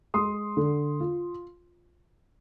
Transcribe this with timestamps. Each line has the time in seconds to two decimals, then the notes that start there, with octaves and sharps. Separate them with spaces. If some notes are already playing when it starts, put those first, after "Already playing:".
0.14 G#3 C6 D#6
0.57 D3
1.00 F4